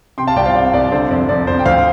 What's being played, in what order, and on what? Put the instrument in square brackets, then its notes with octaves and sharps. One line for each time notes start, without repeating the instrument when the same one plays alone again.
[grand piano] C3 G5 C6
F5 A5
C2 D5 G5
C5 F5
C3 D5
C2 D5
D3 C5
F2 D5
F2 D5
F2 C5
G5
D2 C5 F5